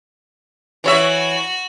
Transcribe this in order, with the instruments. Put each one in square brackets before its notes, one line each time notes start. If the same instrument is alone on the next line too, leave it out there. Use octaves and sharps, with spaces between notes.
[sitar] E3 C#5 E5 [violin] F#4